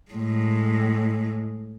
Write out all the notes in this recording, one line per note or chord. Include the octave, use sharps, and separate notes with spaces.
A2 G#3